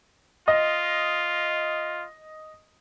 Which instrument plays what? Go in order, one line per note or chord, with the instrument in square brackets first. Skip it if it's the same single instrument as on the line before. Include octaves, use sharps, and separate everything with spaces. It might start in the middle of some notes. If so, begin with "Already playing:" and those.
[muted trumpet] F4 [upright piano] D#5